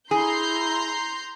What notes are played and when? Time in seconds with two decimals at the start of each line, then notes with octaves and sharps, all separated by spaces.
0.11 E4 G#4 A#5 C6 G6